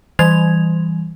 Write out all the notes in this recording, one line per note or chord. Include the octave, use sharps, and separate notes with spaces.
E3 G3 G#6 F7